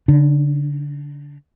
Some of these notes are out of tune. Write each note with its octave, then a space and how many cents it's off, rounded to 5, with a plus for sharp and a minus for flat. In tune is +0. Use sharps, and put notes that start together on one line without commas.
D3 -30 D4 +40